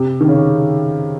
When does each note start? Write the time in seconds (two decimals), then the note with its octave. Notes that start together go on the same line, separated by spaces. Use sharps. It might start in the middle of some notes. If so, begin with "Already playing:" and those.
Already playing: C3
0.21 D#3
0.28 C#3